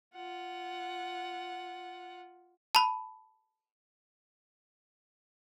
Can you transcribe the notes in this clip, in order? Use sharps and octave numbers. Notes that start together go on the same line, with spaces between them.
F4 F#5
A5 B5